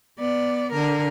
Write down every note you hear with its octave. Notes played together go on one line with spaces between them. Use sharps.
B3 D5
D3 A#4